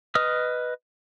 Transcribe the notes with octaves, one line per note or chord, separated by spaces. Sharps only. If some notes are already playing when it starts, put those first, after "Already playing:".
B4 D#5 D#6 F6